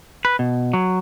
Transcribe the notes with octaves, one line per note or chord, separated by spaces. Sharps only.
B4
B2
F#3